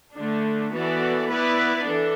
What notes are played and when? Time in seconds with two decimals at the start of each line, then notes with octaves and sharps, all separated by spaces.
0.15 D3 A3 D4
0.71 E3 B3 F#4 A4 D5
1.28 B3 E4 B4 D5
1.83 E3 D4 A4